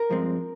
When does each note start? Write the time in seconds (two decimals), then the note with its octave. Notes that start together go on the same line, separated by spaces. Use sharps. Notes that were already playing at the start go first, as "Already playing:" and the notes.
Already playing: A#4
0.10 G2 F3 G#3 C4